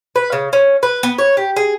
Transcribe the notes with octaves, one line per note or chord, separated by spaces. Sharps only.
B4
C#3
C#4
B4
B3
C#5
G4
G#4